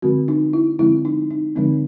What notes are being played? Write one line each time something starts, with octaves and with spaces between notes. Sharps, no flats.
D3 F3 G#3 C4 F#4
D#4
E4
D3 F3 G#3 C4 E4
D#4
D#4
D3 F3 G#3 C4 D#4